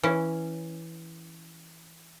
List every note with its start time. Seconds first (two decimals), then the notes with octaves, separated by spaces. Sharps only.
0.03 E3 C#4